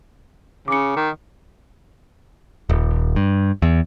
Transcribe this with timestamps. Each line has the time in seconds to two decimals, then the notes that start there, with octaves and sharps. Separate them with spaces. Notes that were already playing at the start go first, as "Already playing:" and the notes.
0.68 C#3 D6 C#7
0.96 D#3
2.69 D#1
3.16 G2
3.62 E2